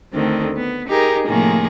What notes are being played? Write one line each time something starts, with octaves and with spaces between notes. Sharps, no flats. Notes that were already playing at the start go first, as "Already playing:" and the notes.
D2 D3 D#3 C4
B3
D#4 G4 G#4 A#4
A2 C3 D#3 F3 A#3 G#4